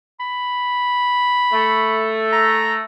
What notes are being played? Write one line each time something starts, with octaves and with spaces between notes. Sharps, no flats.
B5
A3
A#5